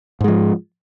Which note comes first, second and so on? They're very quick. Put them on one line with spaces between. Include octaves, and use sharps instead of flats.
G#2 G#3 F3